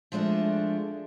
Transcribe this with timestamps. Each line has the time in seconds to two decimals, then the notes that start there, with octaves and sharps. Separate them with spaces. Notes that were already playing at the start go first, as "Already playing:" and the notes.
0.12 F3 G#3 A3 D4